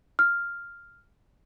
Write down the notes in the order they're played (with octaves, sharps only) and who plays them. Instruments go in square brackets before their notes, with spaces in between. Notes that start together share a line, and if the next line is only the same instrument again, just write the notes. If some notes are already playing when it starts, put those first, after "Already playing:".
[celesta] F6